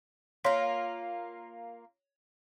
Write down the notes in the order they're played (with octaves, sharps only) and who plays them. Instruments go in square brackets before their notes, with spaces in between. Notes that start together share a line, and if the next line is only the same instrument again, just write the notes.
[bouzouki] A#3 F4 [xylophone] C#5 C6 B6